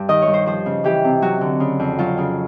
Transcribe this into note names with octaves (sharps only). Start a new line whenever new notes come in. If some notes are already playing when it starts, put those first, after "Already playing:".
Already playing: G2
D#3 D#5
C#5
G2
C5
F3 C5
C#3
E3 G4
C3
F#3 F#4
D3
C#3
F2
F#3 F4
C#3